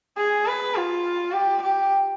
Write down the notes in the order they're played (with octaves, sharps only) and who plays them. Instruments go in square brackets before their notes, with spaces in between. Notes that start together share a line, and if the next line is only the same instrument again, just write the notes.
[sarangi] G#4
B4
F4
G4
G4